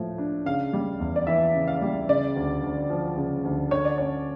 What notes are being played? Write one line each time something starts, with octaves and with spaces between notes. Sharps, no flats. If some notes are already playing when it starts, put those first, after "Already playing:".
Already playing: A2 F3 A3
D4
C#3 F5
G3
E2
D5
E3 E5
C#3
F5
G3
C#3 D5
D2
D2
F3
C#3
D2
D3 C#5
D5
C#4 C#5